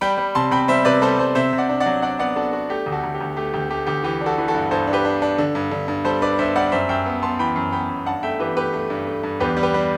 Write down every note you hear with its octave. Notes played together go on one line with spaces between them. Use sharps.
G3 G5 B5
G3
C3 A5 C6
C3 G5 B5
G3 C5 E5
C3 B4 D5
G3 A4 C5
G3 A4 C5
C3 C5 E5
C3
D5 F#5
D4
D5 F#5
F#3
D4 D5 F#5
B3 D5 F#5
D4 F#4 A4
D4 F#4
A3 G4
D2
F#4 A4
D2
G4
D2
A3 G4
D2 G4
A3 G4
D2 G4
E3 G4
D4
F#4 A4
E3
F#4 A4
G2
G2 A4 C5
D4
G4 B4
D4
D4
D3
G2
D3
G2
G3 A4 C5
D4 B4 D5
G2 C5 E5
G3 D5 F#5
F#2 C5 E5
F#2 E5 G5
B3
B3 A5 C6
E3 G5 B5
F#2
B3 G5 B5
F#2
G2 F#5 A5
A3 E5 G5
E3 G4 B4
A3 G4 B4
A3
G2
A3
G2
E2 G4 B4
G3
G4 B4
G3